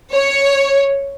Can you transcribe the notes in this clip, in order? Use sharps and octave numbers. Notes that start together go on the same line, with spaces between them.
C#5